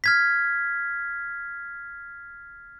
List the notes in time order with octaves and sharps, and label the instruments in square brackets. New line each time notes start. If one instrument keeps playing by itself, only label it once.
[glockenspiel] F6 G#6 B6